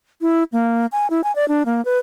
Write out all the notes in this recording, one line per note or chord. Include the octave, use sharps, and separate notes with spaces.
E4
A#3
G#5
E4
G#5
D5
D4
A#3
B4